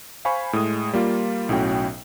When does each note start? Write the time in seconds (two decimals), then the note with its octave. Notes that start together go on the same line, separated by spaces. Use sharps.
0.25 C5 F5 G#5 B5 C#6
0.53 A2 G#3 D#6
0.93 G3 A#3 F4
1.49 B1 A2 C#4 F#4 G5